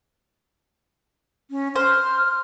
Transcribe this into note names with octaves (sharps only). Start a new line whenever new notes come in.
C#4
C5 F6